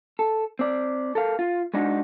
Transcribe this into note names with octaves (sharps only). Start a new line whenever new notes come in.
A4
C4 D5
A4 A#4 F5
F4
G#3 D4 D#4 F#4